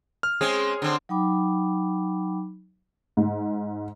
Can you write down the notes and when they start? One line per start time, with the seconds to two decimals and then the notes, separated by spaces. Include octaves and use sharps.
0.23 F6
0.41 G#3 C4 C#4 G#4
0.82 D3 C4
1.09 F#3 D#4 G5 B5 D6
3.17 G#2